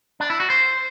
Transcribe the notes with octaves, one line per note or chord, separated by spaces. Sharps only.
D4
E4
F#4
C5